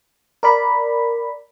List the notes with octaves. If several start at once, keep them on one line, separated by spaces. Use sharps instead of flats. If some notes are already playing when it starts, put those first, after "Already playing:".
A#4 D5 B5